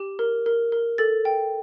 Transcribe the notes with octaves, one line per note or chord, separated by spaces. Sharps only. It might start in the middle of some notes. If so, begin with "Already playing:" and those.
Already playing: G4
A#4
A#4
A#4
A4 A6
G5